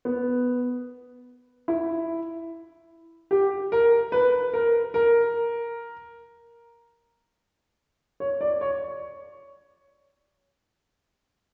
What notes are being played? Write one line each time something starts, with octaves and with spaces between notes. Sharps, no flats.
B3
E4
G4
A#4
B4
A#4
A#4
C#5
D5
C#5